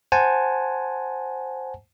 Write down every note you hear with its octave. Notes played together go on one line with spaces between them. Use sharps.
C5 F#5 G#5 A5